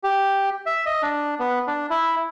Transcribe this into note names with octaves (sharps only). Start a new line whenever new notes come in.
G4
E5
D#5
D4
B3
D4
E4